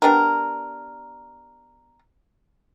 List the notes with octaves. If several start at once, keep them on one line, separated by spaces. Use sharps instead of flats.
B3 D4 G4 A#4